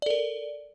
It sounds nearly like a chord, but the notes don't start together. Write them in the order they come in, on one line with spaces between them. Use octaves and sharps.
D5 A4 A#4